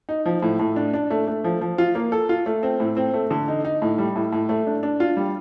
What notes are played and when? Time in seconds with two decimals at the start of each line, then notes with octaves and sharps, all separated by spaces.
0.09 D#4
0.26 F3
0.43 A2
0.59 A2
0.76 D4
0.93 D4
1.10 A3
1.27 A3
1.44 F3
1.61 F3
1.78 F4
1.95 A#3
2.12 A4
2.29 F4
2.46 A3
2.63 C4
2.80 A2
2.97 C4
3.14 A3
3.31 D3
3.48 D#4
3.65 D#4
3.82 A2
3.98 G3
4.16 A2
4.32 A2
4.49 A3
4.67 D4
4.83 D4
5.00 F4
5.17 G3